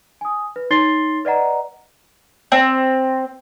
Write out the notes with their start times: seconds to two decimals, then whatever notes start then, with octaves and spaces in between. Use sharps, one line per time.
0.21 G#5 D#6
0.56 B4
0.71 D#4 C#5 C6 A6 C7 G7
1.25 B4 D5 D#5 F#5 A#5
2.52 C4